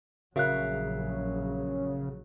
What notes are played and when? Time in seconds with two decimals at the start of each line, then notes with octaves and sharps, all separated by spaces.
0.36 A#1 C#3 F#3 F#4 A#4 E5 F5 F#6